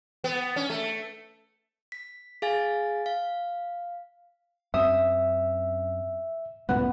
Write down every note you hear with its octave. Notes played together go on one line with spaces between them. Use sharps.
B3
C#4
A3
B6
G#4 F5 G#5 A6
F5
F#2 C4 E5 D#6 E7
C#2 F#2 A2 B3